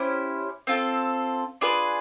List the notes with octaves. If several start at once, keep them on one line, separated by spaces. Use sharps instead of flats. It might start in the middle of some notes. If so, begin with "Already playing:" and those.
Already playing: C#4 E4 G4 C5
C4 F4 A4
D4 F4 G#4 B4